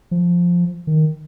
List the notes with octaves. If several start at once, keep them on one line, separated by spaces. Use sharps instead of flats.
F3
D#3